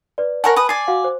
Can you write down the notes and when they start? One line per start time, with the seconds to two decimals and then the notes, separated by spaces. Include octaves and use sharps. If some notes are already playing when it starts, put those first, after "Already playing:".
0.18 B4 D5
0.44 A#4 C#5 F#5 G#5 A5
0.56 B4 D#6
0.69 D5 G#5 C7
0.88 F#4 F5 F#5
1.04 C5